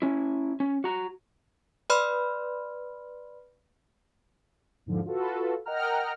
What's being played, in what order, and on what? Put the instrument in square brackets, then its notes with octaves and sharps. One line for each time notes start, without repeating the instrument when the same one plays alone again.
[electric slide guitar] C#4 E4
C#4
F#4 A#5
[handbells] B4 D5 B5 C6 F6
[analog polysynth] E2 G#2 D3 F3
F4 F#4 A4 B4
A#4 D#5 F#5 G5 A#5 F6